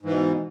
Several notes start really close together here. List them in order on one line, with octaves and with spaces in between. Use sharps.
G#2 E3 B2